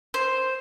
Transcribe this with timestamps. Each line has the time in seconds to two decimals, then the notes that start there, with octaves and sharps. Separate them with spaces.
0.14 C5